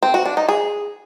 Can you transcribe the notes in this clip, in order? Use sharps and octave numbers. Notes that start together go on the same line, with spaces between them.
C4
F#4
D4
D#4
G#4